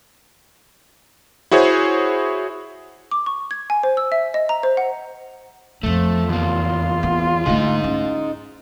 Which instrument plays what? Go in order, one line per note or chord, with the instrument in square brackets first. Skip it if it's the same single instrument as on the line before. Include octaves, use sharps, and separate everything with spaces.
[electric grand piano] E4 F#4 G#4 C5 C#5
[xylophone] D6
C#6
G#6
G#5
C5
E6
E5
D#5
A#5
C5
F#5
[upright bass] F2 B3 [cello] F3 [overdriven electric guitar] A3
[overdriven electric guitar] E2 A#3 [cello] F4
[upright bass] B3
[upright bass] D3 A3 [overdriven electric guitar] D#4 G#4
[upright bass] C#4 E4